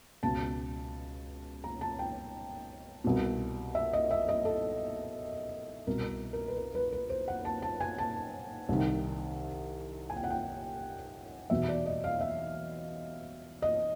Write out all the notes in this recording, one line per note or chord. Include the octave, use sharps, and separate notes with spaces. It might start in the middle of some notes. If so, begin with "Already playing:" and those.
C#2 B2 A5
A#5
A5
G5
C2 B2
E5
D#5
E5
D#5
A4
C2 B2 A#4
A#4
B4
A#4
B4
B4
C5
F#5
A5
A5
G#5
A5
C2 C3 D#3
G#5
G5
F#5
G5
E2 B2 E5
D5
D#5
F5
E5
D#5